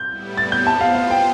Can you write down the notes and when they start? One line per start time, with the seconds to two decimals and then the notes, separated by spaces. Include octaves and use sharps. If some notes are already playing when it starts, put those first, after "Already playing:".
Already playing: G6
0.09 A2 G3 B3 E4
0.37 A6
0.52 G6
0.66 B3 F4 C5 A5
0.81 F5
0.95 F5
1.11 G5